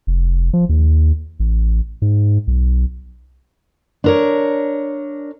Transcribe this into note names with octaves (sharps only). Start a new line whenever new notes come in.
F1
F3
D#2
A1
G#2
B1
D4 A#4 C#5